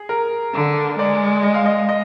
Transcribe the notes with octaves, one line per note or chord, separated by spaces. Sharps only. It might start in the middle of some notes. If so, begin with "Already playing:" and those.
Already playing: G#4
A#4
D3
G#3 D5
D#5
F5
D#5
D#5